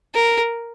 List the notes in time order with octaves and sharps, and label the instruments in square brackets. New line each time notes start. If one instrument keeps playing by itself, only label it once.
[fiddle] A#4